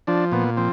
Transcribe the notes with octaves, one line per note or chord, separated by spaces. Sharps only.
F3 D4
A#2 B3
F3 C4